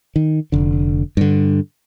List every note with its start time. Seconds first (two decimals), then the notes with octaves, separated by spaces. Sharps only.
0.16 D#3
0.52 F1 D3
1.17 G2 D3